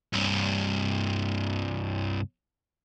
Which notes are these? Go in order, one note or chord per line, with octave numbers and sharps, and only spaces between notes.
C2 G2